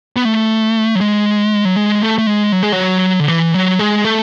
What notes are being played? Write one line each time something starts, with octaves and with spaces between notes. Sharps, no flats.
B3
A3
F#3
G#3
F#3
G#3
A3
A3
G#3
F#3
G#3
F#3
D3
E3
F#3
G#3
A3